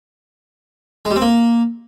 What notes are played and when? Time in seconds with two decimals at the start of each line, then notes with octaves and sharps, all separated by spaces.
1.05 G#3
1.11 G3
1.16 C4
1.21 A#3